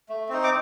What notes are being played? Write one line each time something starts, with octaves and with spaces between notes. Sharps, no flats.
A3
C4 D#4
D6